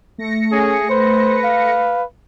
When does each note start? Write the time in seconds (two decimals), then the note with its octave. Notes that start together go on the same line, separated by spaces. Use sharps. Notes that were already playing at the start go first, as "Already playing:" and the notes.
0.18 A3 A#6 C#7
0.52 C#4 G#4
0.90 B4 C5
1.44 F5